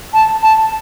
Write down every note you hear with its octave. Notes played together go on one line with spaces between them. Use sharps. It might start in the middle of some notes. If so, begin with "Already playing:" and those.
A5
A5